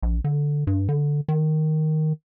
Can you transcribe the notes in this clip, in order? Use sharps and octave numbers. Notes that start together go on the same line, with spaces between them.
A#1
D3
G2
D3
D#3